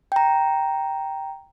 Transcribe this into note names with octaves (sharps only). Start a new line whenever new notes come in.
G5 A#5